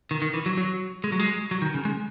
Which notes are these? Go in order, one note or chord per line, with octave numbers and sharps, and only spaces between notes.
D#3
D#3
E3
F#3
F#3
G#3
F#3
G#3
F#3
D#3
C#3
G#3